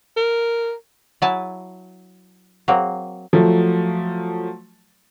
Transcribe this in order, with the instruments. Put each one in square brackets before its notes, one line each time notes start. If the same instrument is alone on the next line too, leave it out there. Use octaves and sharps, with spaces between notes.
[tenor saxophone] A#4
[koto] F#3 E4 E5 G#5 A5
F#3 A#3 C4
[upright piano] F3 F#3 A3